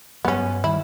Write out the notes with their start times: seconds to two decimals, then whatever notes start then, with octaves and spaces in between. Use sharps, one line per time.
0.25 G2 F#3 B3 C#4
0.64 D#3 G3 E4